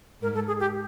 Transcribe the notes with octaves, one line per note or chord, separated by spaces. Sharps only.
G#2 A#4
A4
G#4
G4